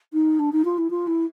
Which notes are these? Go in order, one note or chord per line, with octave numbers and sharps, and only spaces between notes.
D#4
D4
D#4
F4
E4
F4
E4